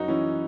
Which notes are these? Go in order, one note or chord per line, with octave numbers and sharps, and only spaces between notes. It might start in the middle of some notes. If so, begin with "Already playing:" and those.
Already playing: F#2 D#4 F#4
E3 C#4 E4